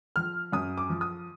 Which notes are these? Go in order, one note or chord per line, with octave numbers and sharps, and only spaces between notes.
F3 F6
F#2 D#6
D6
F3
D#6